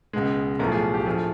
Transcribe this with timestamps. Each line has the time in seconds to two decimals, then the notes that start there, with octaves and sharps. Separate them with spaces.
0.13 C#2 B2 G#3
0.59 B1 A2 F3 A3 A#4
0.72 G#4
0.94 G4
1.06 A#1 A2 F3 A3 G#4